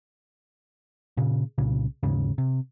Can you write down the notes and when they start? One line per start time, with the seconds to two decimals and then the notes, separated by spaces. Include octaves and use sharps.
1.17 A#2 C#3
1.58 C2 A#2 C#3
2.03 D#2 G#2 C#3
2.38 C3